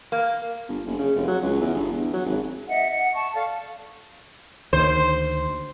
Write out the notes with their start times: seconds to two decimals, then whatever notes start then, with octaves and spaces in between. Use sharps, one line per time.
0.12 A#3
0.69 G1
0.86 F#1
0.99 C#3
1.16 F1
1.28 F#3
1.43 C#2
1.61 E2
1.74 G1
1.92 E2
2.14 F#3
2.26 G#1
2.69 D#5 E5 F#5
2.89 F#5
3.15 A5 C#6
3.33 A4 D5 F5
4.73 D2 D#3 A#3 C5